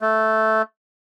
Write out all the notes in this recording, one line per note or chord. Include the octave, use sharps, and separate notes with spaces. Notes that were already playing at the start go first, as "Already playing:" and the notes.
A3